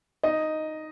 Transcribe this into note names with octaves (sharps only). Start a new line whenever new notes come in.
D#4 D#5